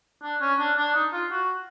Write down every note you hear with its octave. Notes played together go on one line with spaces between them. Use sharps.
D4
C#4
D4
D4
D#4
F4
F#4